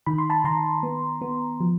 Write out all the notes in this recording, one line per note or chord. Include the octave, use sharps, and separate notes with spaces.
D#3 B5
C6
A5 B5
D#3 A#5 C6
B3
B3
F3